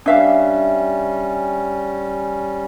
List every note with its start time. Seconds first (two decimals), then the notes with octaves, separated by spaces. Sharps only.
0.06 G3 C#4 D4 E5 F5